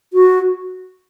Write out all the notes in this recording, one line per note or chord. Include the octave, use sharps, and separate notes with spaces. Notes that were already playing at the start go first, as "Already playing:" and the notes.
F#4